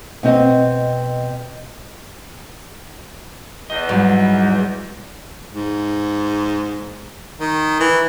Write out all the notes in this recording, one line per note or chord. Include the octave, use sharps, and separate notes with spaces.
B2 C4 D#5
E2 D#5
G#2 F#3 G3
G#2
D#3
E3